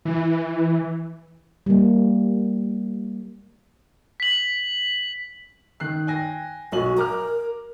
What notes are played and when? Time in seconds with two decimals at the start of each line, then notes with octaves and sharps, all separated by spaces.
0.05 E3
1.66 G3 A#3
4.20 B6 F#7
5.80 D#3 F#6 C7
6.07 G5 G#5 A#6
6.72 B1 F#4 G#5 F#7
6.97 A#4 A#5 D6 F6